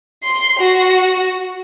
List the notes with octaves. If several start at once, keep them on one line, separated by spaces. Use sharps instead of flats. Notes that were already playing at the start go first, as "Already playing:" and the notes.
C6
F#4